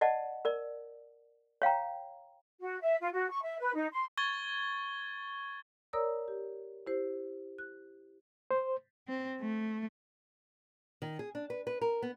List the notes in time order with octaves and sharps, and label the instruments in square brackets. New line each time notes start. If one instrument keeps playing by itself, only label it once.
[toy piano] D5 D#5 F#5 A5
A#4 D5
C#5 F5 G5 A#5
[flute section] F#4
E5
F4
F#4
C#6
E5
B4
D#4
C6
[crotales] C#6 G#6 A6 G7
[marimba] A#4 C#5 D5 A#5 D#6 E6
G4
E4 G4 C5
F#6
[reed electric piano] C5
[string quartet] C4
A3
[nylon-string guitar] D#3
G#4
D4
B4
B4
A#4
B3